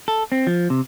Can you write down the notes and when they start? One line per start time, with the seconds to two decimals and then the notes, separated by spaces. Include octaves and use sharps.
0.08 A4
0.32 C4
0.47 F3
0.70 C3